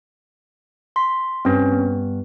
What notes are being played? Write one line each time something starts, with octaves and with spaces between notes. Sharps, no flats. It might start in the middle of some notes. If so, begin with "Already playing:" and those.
C6 B6
G2 C4 C#4
B3